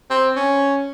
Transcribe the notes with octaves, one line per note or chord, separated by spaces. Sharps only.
C4
C#4